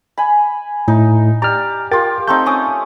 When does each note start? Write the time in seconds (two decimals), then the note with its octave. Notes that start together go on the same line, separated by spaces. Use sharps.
0.18 G#5 B5
0.88 A2 D#4
1.42 G4 D5 A#5 F6
1.91 F4 G4 A#4 G5 A6
2.28 A3 C4 D#4 G6
2.46 C#4 D6 D#6